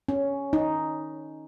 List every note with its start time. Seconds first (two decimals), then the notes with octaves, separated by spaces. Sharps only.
0.09 C#4
0.53 D#4